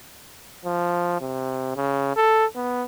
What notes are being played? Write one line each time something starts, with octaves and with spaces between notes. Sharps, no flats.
F3
C3
C#3
A4
B3